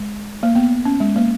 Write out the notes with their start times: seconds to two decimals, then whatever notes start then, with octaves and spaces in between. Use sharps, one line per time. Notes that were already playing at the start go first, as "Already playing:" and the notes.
Already playing: G#3
0.43 A#3
0.55 B3
0.85 C#4
1.00 G#3
1.16 A#3